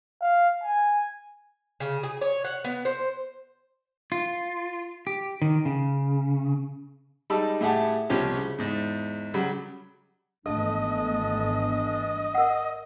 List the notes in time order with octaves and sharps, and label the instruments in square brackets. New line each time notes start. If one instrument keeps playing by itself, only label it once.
[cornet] F5
G#5
[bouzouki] C#3
G#4
C#5
F#5
B3
C5
[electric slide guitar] F4
G4
D#3
C#3
[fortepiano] G3 G#3 D#4 A5 B5 E6
A2 E4 G4 G#4 F#5 A5
C2 B2 F3 C#4 G4
C#3
E2 G#2
C#3 F#3 G3 B5
[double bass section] G#1 A3 B3 [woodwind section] E3 G3 D4 [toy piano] A4 [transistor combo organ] D#5
[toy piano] A#4 F#5